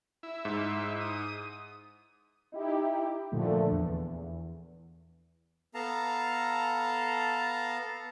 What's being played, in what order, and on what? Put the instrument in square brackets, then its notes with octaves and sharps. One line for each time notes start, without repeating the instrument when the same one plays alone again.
[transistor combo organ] E4
[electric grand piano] G#2
[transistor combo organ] D#6
[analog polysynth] D#4 E4 G4
A#2 D3 F3 A3
E2
[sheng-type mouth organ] B3 A4 F5 A5 A#5